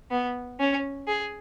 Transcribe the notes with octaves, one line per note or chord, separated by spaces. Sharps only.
B3
C#4
G#4